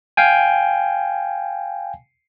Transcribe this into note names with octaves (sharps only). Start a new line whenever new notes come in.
F5 G5 G#5